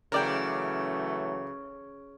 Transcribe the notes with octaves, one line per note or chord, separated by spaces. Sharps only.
C#3 E3 F#3 A3 A#4 D5 G5